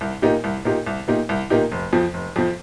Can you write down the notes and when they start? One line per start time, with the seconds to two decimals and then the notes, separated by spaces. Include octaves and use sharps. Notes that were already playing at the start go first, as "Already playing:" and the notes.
0.01 C2
0.22 A#2 A#3 D#4 G4
0.44 C2
0.65 A#2 A#3 D#4 G4
0.86 C2
1.08 A#2 A#3 D#4 G4
1.29 C2
1.50 A#2 A#3 D#4 G4
1.72 F1
1.93 F2 F3
2.14 F1
2.36 F2 F3